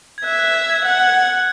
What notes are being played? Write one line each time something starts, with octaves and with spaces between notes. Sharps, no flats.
G#6
E5 F#6
F#6
G#6
G#6
F#5 F#6